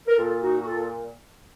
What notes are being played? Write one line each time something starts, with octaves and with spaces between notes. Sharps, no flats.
A#4
A#2 F4 A4
D#4 F#4
F#4
F4 A4